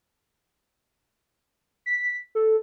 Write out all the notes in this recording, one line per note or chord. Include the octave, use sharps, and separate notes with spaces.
B6
A4